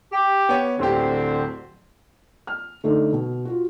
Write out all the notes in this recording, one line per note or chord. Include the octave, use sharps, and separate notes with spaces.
G4
B3 C#5
D1 D3 C4 G4
F6
D3 A3 D#4
B2
F4 F#4